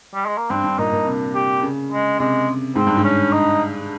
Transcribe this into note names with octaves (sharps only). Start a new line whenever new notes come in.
G3
G#3
A#3
G2 C4
G2
A#2 D#4
A#2
C3
G4
C#3
G#3
C3 G#3
G#2 C4
G2
G#2
C#4
D#4